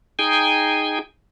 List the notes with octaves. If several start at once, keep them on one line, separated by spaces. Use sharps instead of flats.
D#4 G#4 G5 G#5